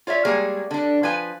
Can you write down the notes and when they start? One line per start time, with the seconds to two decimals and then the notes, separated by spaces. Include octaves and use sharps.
0.07 F4 C#5 D5 E5
0.25 G3 G#3 A#3 G#4 C#5
0.71 D3 D4
1.03 F3 B4 G#5